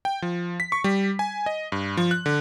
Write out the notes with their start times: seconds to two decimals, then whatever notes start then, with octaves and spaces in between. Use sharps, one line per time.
0.05 G5
0.22 F3
0.60 B6
0.72 C#6
0.84 G3
1.19 G#5
1.46 D#5
1.72 G2
1.97 F3
2.11 F#6
2.26 D3